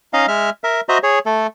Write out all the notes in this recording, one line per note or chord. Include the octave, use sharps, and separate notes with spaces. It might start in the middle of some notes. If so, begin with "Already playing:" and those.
C#4 D#4 D#5 F5
G#3 E5 F6
A#4 E5
F#4 C5 D#5 E5 A#5
G#4 C#5
A3 A4